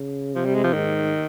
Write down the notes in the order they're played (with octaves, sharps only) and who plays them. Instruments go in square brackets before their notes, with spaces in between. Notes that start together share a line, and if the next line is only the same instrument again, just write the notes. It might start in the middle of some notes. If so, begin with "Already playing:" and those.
Already playing: [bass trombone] C#3
[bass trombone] C3 [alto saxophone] F3
[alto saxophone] G3
G#3
F3
[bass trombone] G#2 [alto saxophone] D#3